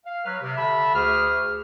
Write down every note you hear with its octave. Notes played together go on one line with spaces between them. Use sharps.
F5
F#3 B4 F6
C3
D3 E5 A5 B5
D2 G#4 F6